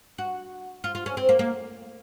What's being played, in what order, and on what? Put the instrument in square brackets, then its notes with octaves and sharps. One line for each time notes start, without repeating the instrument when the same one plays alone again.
[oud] F#4
F4
F4
C#4
C4
A#3
A#3